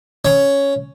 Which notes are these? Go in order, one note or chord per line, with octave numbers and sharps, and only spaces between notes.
C#4